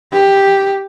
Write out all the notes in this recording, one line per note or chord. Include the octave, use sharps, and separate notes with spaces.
G4